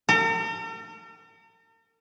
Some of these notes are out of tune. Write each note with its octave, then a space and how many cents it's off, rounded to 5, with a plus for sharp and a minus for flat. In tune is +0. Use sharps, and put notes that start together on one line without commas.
A#4 -45